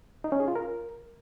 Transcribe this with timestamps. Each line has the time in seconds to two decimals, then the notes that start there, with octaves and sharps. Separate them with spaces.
0.24 D#4
0.32 C#4
0.40 G#4
0.48 F4
0.56 A#4